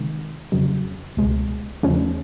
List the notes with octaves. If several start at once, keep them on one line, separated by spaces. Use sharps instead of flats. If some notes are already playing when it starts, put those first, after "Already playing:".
Already playing: C3 D#3 G#3
F2 C#3 F#3
C#2 B2 G#3
E2 C#3 F3 A3 C#4